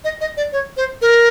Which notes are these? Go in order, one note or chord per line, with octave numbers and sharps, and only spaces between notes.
D#5
D#5
D5
C#5
C5
A#4